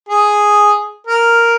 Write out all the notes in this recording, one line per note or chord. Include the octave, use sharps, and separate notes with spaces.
G#4
A#4